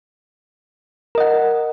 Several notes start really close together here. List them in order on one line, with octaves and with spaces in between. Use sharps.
A#4 D#5 F#5